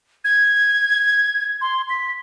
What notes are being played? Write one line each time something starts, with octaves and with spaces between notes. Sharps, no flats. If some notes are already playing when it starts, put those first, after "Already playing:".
G#6
C6
B6